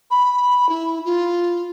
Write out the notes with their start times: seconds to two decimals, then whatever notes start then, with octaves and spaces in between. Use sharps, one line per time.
0.10 B5
0.69 E4
1.05 F4